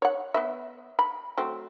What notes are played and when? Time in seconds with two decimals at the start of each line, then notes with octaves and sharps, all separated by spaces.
0.02 C#5 F#5
0.34 B3 B4 E5
0.99 B5
1.38 F#3 A3 C4